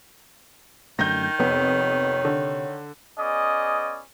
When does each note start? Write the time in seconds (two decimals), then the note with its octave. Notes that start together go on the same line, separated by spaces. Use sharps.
0.99 F#2 D3 D#3 A3 G6 A#6
1.39 F2 C3 B3 C#5
2.25 D3
3.19 B3 C#4 G#4 D5 D#5